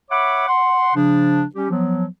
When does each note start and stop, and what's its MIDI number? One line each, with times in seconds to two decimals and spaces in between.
0.10 0.45 73
0.10 0.45 76
0.10 0.45 78
0.10 0.45 83
0.10 0.45 86
0.48 0.95 78
0.48 0.95 84
0.95 1.43 49
0.95 1.43 53
0.95 1.43 62
1.55 1.69 55
1.55 1.69 61
1.55 1.69 67
1.70 2.05 53
1.70 2.05 54
1.70 2.05 59